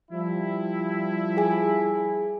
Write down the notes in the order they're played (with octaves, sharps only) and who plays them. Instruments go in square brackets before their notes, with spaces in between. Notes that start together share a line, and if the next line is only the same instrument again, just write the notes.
[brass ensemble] F3 G3 E4
[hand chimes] G#4 G#5